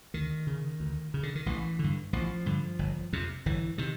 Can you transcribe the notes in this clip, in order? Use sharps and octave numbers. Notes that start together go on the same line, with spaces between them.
D2 D#3
C#3
D2
C#3
D3
D#3
A1 E3
G2 D3
A1 F3
G2 D3
G1
F2 C3
G1 E3
C3 D#3